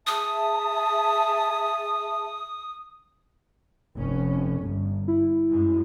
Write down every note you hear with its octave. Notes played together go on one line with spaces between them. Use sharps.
G#4 E5 A5 D#6
F1 C#4
G1
E4
F#2 G#3